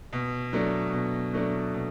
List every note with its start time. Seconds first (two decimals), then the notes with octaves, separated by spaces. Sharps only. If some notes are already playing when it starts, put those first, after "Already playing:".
0.13 B2
0.53 F#3 A3 D4
0.93 B2
1.33 F#3 A3 D4
1.74 B2